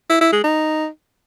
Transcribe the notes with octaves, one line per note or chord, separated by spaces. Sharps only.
E4
E4
G#3
D#4